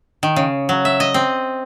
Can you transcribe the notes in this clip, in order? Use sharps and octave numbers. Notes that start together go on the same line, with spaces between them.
D#3
C#3
F#3
E5
D#5
C4